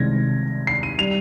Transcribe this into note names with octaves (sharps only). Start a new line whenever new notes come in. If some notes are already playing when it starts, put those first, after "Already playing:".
Already playing: C2 C3 D#3 G#3 G#6 A#6
C7
D#7
G3 F7